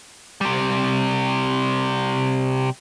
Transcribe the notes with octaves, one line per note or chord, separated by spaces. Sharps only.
C3 G3